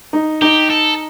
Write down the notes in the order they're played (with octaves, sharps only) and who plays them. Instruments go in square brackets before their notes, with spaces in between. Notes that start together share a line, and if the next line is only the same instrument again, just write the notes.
[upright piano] D#4
[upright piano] D#4 [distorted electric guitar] G4
[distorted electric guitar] A4